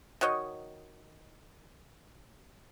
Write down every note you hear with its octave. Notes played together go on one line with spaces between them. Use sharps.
D#3 F#4 C#5 D#5